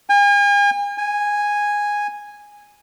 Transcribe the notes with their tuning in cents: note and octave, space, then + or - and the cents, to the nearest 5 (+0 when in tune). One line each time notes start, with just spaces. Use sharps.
G#5 -40
G#5 -5